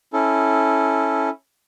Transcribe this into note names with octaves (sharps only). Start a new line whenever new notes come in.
C#4 E4 A4